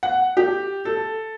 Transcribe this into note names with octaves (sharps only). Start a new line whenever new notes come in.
F#5
G4
A4